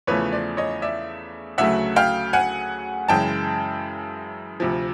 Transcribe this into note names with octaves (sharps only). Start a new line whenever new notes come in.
E2 C#3 F3 A3 B4 C#5
C5 D5
C#5 D#5
D5 E5
D2 C#3 F#3 A3 E5 F#5
F5 G5
F#5 G#5
F#2 C#3 E3 G#3 G5 A5
D2 C3 F3